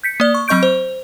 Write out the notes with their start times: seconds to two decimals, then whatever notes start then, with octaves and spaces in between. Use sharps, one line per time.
0.03 G6 B6 C#7
0.20 A#3 D5
0.34 C#6
0.48 F#3 C4 D#5 C#6 G6 D7
0.63 C5